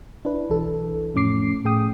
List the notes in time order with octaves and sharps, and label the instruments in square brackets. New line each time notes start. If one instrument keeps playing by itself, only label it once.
[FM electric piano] D4 E4 B4
B1 E3 A4
F2 A2 C#4 D6 C7
A2 G#4 G5 D#6